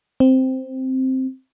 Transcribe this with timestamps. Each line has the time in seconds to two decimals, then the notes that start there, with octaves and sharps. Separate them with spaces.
0.20 C4